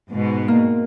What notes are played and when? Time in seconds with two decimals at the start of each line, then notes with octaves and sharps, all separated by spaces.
0.11 G#2 B2
0.48 A#3